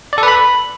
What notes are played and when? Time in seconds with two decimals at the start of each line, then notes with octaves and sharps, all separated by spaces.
0.13 D5
0.18 A4
0.23 B4
0.28 B5